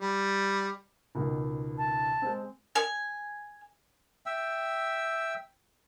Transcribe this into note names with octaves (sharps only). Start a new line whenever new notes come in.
G3
C#2 B2 D#3
A5
G#3 C4
G#5
E5 G5 E6